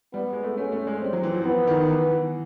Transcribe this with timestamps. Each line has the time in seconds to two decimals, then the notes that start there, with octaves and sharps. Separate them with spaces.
0.13 G3 B3
0.33 G#3
0.43 A3
0.57 A3 C#4
0.72 A3
0.87 G#3
1.01 G3 C4
1.13 F#3
1.23 E3
1.34 F3
1.45 E3 B3
1.67 D#3
1.89 E3
2.11 E3